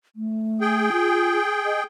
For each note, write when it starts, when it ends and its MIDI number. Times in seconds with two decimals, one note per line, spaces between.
0.16 0.90 57
0.61 1.83 68
0.61 1.83 79
0.92 1.38 65
1.66 1.79 75